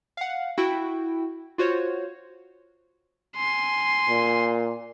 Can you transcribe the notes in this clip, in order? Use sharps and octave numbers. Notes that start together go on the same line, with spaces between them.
F5 F#5
E4 F#4 G5
F4 F#4 C5 C#5
G#5 C6
A#2